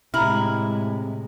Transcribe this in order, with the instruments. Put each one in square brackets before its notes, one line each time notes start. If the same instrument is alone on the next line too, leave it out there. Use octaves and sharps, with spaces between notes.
[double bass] A2 G#3 [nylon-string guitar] C3 [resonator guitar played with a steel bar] E4 [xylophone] A#5 B5 F6